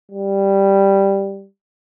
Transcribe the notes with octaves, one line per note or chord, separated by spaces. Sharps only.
G3